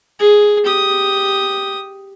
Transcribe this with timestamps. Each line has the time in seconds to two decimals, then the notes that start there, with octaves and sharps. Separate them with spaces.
0.20 G#4
0.66 G4 D#6